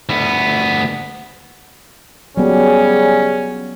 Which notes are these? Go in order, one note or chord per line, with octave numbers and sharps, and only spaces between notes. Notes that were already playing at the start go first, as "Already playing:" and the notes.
D2 B3
C#3 F#3 G3 B3 C#4 G#4